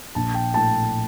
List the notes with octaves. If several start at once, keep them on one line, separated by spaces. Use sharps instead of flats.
A#1 A5
G5
A2 A3 A5